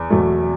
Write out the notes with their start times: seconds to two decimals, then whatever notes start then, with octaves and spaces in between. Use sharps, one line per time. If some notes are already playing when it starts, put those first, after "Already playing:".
Already playing: E2
0.10 E2 B2 F#3 A3